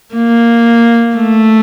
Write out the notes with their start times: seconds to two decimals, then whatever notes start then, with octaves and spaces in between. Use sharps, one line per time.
0.15 A#3
1.17 A3